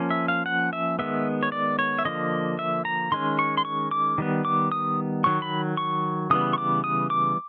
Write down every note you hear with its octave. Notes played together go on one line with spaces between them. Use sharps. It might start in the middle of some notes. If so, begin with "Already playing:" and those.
Already playing: F3 A#3 C#4
E5
F5
F#5
E5
D#3 G#3 B3 E5
C#5
D5
C#5
E5
D3 F3 A#3 D#5
E5
A#5
D#3 G#3 C#4 C6
C#6
C6
C#6
D6
D#3 G3 B3
D6
D#6
D#3 F#3 C#6
B5
C#6
C#3 E3 G3 B3 D#6
C#6
D6
D#6
D6